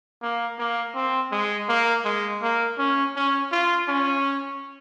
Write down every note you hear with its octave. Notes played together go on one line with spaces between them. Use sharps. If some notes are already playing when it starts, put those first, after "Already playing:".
A#3
A#3
C4
G#3
A#3
G#3
A#3
C#4
C#4
F4
C#4